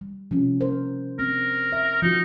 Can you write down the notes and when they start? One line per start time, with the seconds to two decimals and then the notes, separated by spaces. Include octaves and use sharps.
0.01 G3
0.31 C3 F3 C#4
0.61 A#4 C5
1.19 C4 A#4
1.72 E5
2.02 F3 D#4 F#4